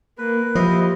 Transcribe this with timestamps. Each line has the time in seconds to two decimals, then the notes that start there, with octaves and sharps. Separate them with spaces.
0.18 A#3 B4
0.55 F3 E4 G4 D#5